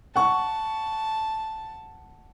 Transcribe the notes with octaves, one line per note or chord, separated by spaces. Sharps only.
F#5 A5 C#6